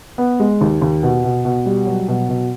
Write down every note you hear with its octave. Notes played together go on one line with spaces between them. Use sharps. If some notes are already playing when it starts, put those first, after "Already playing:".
B3
G#3
D#2
D#2
B2
B2
B2
G3
F#3
B2
B2